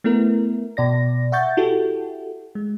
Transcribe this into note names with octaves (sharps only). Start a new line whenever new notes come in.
A3 B3 E4 A#4
B2 D5 A#6
E5 F#5 C#6 G6 A6
E4 F#4 G4 A4
G#3